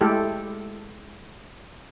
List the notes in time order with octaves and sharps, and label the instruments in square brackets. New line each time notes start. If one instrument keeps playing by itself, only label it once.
[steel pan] G#3 A3 E4 G4 A4